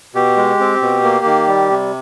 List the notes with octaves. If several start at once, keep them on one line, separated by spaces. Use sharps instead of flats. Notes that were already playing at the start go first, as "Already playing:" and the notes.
B2 G4
G#3
C4
B2
A#3
D#3
G3
C3